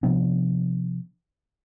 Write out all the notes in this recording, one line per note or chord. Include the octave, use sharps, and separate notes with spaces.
C3 F3 B3 D4